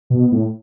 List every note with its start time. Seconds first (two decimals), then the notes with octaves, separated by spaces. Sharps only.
0.10 B2
0.32 A2